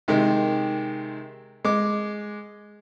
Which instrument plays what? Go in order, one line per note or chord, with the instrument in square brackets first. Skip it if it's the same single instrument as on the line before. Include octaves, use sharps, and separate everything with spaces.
[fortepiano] C3 D#3 G#3
G#3 D6